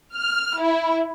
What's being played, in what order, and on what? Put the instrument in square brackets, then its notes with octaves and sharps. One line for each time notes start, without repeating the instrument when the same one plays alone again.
[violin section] F6
E4